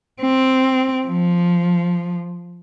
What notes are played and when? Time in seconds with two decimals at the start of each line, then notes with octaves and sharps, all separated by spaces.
0.21 C4
1.07 F3